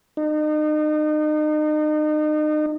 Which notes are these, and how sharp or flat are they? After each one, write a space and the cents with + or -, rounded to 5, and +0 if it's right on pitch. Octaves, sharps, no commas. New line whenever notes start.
D#4 -35